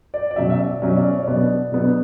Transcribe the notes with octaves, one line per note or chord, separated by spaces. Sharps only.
D5
D5
B2 F#3 C#4 E5
E5
D5
B2 F#3 C#4 E5
D5
C#5
B2 F#3 B3 D4 D5
B2 F#3 B3 D4